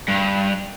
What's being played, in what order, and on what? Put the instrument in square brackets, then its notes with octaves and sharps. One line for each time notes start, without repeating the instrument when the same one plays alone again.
[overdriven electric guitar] G2